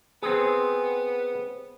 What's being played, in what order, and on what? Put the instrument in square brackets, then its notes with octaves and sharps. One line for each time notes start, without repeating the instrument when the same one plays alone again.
[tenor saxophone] B3 [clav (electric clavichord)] C4 G#4